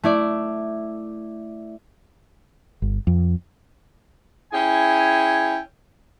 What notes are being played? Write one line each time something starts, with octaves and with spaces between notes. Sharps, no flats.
A3 E4 D5
G1
F2
C#4 E4 G#4 G5 G#5